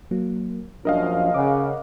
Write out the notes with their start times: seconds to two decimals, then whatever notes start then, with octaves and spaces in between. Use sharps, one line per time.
0.11 F#3 A#3
0.85 A#1 F#2 F3 D4 A#4 D#5 F5
1.34 C#3 F#5 D6